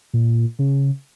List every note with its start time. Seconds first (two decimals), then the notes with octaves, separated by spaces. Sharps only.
0.13 A#2
0.59 C#3